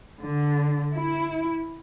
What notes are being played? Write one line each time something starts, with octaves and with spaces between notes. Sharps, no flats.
D3
E4